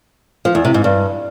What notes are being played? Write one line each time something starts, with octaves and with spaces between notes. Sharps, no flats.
F3
E2
C3
G#2
G2